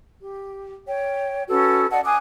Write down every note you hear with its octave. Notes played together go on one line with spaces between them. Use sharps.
G4
C#5 G5
C#4 F#4 A4 B4
D5 D#5 F#5 A5
G#5 D6 D#6 F#6